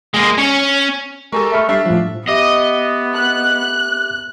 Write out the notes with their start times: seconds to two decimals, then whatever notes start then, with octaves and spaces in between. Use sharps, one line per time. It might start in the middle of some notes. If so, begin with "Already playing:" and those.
0.14 G#3 A#3
0.38 C#4 C#5
1.33 G#3 G4 A4 A#4 G#5 C#6
1.52 A3 E5 B5 F6
1.69 G3 D4 E5 F6 A6 C7
1.86 A2 F3
2.29 B3 G4 D#5 E5 D6
3.15 F#6